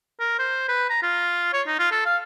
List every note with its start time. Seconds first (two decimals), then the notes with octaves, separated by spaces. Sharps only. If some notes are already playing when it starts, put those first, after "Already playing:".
0.20 A#4
0.39 C5
0.68 B4
0.90 A#5
1.03 F4
1.53 C#5
1.67 D#4
1.79 F4
1.92 A4
2.06 F5